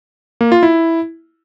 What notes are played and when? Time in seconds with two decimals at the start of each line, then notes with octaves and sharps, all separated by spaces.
0.41 A#3
0.52 F4
0.63 E4